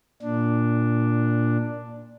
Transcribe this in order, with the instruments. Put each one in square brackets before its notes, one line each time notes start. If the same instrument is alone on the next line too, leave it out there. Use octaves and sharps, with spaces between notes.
[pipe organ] A#2 D4